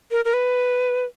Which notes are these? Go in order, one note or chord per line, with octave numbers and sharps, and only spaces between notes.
A#4
A#4
B4